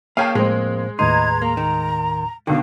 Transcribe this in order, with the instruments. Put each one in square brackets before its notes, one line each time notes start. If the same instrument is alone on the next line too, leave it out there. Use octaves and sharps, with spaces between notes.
[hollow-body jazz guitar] A#3 G#4 C#5 [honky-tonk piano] F5 G5 A5
[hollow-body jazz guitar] F2 A#3 [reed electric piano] A2 C5 [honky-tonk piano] G#3
[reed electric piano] D#2 A2 C6 [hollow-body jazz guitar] D#4 [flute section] B4 A#5 G#6
[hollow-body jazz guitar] A#3 [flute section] A#5
[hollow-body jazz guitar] D#3
[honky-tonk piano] B2 D#3 [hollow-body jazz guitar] D3 [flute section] F5